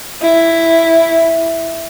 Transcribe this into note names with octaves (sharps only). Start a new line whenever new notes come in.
E4